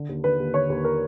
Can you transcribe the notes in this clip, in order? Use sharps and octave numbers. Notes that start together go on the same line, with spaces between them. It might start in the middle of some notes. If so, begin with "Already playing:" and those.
Already playing: D3
D#2
D3 B4
D#2
D3 C#5
D#2
A#4